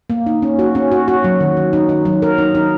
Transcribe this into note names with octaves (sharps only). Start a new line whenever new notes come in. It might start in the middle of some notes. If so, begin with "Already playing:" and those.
A#3
D#4
C#4
F#4
C#4
F#4
F#4
F#3
D#3
D#3
D#4
D#4
F#3
A#4
D#4
D#4